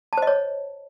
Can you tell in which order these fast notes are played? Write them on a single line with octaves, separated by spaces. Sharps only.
A5 C5 D#5 C#5